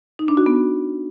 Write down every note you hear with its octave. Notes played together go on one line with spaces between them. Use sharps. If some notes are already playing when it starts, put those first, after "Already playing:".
D#4
D4
F#4
B3